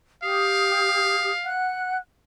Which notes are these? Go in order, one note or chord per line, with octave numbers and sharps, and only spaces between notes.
G4 F5 D#6
F#5 F#6